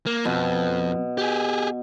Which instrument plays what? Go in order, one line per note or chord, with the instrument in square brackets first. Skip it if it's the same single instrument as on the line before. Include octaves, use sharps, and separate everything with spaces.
[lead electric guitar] A#3
[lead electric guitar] F2 [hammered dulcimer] B2
[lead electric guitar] G4 G#4